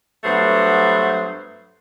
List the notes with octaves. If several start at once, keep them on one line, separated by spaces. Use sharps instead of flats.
G2 F#3 A3 B3 C5